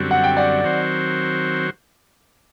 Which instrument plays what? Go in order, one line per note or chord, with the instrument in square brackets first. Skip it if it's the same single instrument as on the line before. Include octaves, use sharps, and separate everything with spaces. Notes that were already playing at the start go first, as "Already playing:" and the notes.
Already playing: [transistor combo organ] F#2 D3 G3 C4 F#4
[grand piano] F#5
G5
D5 F#5
[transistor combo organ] D#3 F#3 C4 F#4 C5